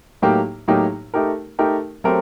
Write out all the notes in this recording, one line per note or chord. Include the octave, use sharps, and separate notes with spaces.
A2 F#3 A#3 D#4 G4
A2 F#3 A#3 D#4 G4
A3 D#4 G4 A#4
A3 D#4 G4 A#4
F#3 A3 C4 G4 A#4